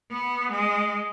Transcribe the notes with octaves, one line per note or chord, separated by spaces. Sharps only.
B3
G#3